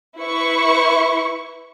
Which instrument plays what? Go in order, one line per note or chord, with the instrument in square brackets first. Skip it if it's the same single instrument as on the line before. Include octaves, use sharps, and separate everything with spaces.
[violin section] E4 B4 C#6